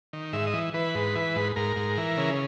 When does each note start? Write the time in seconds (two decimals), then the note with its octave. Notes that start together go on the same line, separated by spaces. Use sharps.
0.13 D#3
0.33 G#2 E5
0.47 D#5
0.53 E3
0.74 E3 B4
0.95 G#2
1.15 E3
1.36 G#2
1.56 G#2 A#4
1.76 G#2
1.98 E3
2.17 C#3